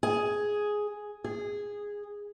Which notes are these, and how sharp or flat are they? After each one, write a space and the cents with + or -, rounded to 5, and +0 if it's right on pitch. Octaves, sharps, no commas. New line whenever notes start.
G#4 +5
G#4 -10